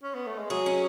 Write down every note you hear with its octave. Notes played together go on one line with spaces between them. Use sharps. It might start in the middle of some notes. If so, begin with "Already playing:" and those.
C#4
B3
A3
G#3
F#3 G#4
C#4